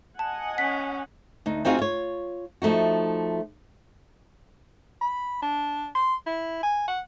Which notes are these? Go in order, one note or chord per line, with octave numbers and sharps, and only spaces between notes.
D#5 F#5 G#5 A5
C#4 B6
D2 D#4
C4 D#4 F4 F#4 G#4 F5
F4 C#5
F3 A3 D#4 F#4
B5
D4
C6
E4
G#5
F#5